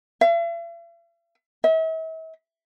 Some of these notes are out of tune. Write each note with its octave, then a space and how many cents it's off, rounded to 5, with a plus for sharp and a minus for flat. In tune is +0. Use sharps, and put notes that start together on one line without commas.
E5 +45
E5 -40